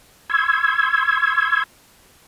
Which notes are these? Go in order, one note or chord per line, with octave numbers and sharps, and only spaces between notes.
C6 C#6 E6 G#6